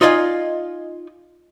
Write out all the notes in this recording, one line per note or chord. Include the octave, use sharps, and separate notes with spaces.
D#4 F4 D5 D#5 F5 G#5